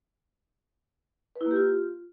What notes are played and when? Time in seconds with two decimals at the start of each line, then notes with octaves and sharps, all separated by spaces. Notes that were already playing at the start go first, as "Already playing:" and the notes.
1.35 B4
1.41 E4
1.46 A#3
1.51 G4
1.56 F4